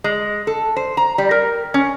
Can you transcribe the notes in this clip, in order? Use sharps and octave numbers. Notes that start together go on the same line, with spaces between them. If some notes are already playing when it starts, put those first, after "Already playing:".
G#3
A4
C5
A#5
G3
A#4
C#4